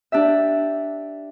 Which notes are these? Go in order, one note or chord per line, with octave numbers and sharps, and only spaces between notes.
D4 G4 E5